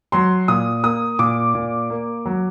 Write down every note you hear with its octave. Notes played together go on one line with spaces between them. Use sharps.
F#3 C6
A#2 D#6
A#3 D#6
A#2 D6
A#2
A#3
F#3